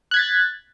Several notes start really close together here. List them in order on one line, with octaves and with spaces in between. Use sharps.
F#6 G#6 B6 A6